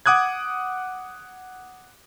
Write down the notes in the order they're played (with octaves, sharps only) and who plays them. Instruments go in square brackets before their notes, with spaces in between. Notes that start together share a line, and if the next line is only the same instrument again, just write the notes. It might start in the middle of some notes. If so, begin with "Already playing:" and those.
[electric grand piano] F#5 D6 D#6 F#6 G#6